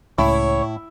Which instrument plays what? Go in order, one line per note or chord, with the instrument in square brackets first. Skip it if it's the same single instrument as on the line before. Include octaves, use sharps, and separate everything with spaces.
[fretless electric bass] C#2 [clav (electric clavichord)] A2 [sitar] E4 [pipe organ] C#5